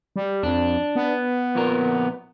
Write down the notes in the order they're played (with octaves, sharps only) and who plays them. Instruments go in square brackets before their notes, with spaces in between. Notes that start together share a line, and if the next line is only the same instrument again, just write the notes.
[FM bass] G3
[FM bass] F2 [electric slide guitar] D4
[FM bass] B3
[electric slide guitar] F2 A#2 A#4